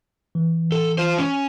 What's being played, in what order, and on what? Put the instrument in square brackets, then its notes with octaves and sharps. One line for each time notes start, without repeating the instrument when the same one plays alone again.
[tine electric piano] E3
[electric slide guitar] A4
F4 C5
C#4